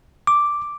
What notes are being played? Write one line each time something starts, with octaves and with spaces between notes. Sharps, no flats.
D6